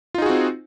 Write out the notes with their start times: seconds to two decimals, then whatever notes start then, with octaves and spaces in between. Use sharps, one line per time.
0.14 F4
0.18 D#4
0.22 G#4
0.26 F#4
0.30 C4